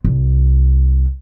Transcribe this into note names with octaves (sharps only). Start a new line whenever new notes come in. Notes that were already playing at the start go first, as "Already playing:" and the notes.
C2